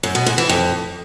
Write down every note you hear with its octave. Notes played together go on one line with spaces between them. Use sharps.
F#2
B2
G#2
E3
F2